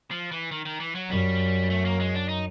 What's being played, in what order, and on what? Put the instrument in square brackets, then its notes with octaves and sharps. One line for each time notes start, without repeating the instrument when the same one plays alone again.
[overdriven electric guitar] F3
E3
D#3
D#3
E3
F#3
[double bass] F#2 [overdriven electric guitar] G3
[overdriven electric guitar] A3
A#3
G#3
D4
D#4